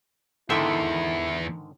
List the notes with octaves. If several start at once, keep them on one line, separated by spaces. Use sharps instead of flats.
E2 G#2 D3 D#3 E4 A4 E5 G5